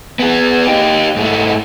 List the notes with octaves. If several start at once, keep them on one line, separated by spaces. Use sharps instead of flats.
B3 G#4
D#4 G4
G#2 A3